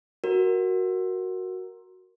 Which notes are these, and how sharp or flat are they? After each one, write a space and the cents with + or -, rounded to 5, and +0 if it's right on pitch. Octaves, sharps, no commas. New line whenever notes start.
F#4 +0 A#4 +0